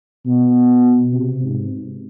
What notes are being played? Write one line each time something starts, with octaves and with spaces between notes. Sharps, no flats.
B2
C3
G#2